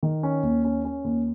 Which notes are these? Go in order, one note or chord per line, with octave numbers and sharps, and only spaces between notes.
D#3
C#4
D#2
C#4
C#4
D#2